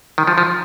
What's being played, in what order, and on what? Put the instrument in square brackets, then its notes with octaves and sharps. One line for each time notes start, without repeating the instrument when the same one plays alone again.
[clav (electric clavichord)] D#3
F3
F3